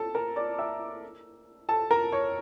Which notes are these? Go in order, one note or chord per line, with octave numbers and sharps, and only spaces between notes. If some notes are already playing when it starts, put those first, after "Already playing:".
Already playing: A4 A5
A#4 A#5
D5 D6
E5 E6
A4 A5
A#4 A#5
C#5 C#6